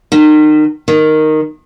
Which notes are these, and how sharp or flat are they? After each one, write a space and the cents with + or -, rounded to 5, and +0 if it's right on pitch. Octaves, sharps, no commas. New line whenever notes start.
D#3 -35
D#3 -5